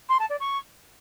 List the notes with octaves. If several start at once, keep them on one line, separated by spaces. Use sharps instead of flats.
C6
A5
D5
C#6